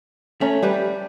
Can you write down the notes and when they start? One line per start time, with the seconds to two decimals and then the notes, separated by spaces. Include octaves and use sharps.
0.41 A3 C#4 C#5 A#5
0.62 G3 G4 B4